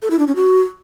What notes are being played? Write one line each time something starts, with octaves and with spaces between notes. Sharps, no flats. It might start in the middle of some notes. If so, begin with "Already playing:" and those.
A4
E4
D4
C#4
F#4